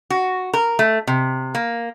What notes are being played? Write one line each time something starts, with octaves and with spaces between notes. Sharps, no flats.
F#4
A#4
A3
C3
A#3